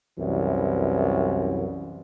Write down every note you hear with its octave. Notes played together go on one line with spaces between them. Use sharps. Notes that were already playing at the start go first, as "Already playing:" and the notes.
C2 F#2 E3